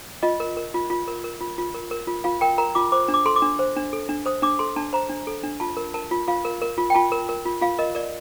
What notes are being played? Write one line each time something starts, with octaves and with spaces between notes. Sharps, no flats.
F4 D#5
A#4
A#4
F4
F4
A#4
A#4
F4
F4
A#4
A#4
F4
F4 F5
A#4 G5
A#4 A#5
F4 D6
C5 D6
D4
D6
A4 C6
D6
D4
C5
D4
A4
D4
C5 D#6
D4 D6
A4 C6
D4 A5
C5 A#5
D4
A4
D4
F4 A5
A#4
A#4 A5
F4
F4 F5
A#4
A#4
F4
G5
F4 A5
A#4
A#4
F4
F4 F5
A#4 D#5
A#4 D5